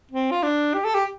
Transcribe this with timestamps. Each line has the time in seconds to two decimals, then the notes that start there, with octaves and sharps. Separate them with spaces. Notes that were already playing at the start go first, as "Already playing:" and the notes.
0.12 C4
0.31 F4
0.43 D4
0.74 G4
0.84 A4
0.95 G4